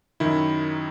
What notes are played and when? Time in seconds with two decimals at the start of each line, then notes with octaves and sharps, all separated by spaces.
0.20 F#2 D#3 E4